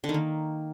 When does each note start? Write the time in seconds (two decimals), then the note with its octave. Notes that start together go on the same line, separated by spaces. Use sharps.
0.04 D3
0.09 D#3
0.14 A#3